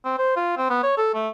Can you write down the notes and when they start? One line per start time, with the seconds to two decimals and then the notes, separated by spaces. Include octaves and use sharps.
0.05 C4
0.18 C5
0.36 F4
0.57 C4
0.70 B3
0.83 C#5
0.97 A4
1.14 A3